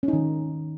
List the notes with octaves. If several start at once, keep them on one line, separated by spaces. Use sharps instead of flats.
C#4
D#4
D#3